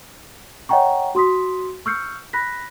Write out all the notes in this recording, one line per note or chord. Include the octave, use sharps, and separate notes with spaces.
C#5 D#5 F#5 G5 A#5 C#6
F#4 C6 D#6 B6
C#6 E6 F6 G6 C7 C#7
B5 F#6 A#6 B6